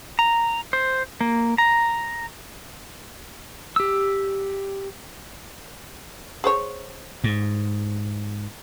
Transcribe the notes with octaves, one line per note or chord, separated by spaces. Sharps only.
A#5
C5
A#3
A#5
G4 E6
G#4 C5 C#5
G#2